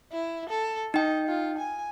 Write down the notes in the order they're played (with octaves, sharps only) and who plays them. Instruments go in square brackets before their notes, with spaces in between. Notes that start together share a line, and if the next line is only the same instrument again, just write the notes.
[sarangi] E4
A4
[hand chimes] D#4 G5 [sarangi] D#5
[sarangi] F4
G#5